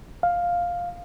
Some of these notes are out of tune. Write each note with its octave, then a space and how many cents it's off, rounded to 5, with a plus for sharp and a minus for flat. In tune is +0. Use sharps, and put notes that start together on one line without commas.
F5 +5